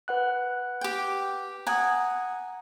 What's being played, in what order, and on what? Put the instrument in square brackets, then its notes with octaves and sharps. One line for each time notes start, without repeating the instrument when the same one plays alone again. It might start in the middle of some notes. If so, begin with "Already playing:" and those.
[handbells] B4 F#5 F#6
[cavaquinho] G4 G5
[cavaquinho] F#5 G#5 [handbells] A#5 D#6